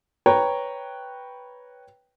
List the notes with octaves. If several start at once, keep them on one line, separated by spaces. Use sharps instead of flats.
B4 C#5 G5 A#5